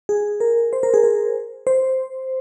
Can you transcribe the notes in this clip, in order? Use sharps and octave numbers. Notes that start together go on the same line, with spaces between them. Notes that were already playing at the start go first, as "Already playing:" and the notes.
G#4
A#4
C5
A#4
G#4
A#4
C5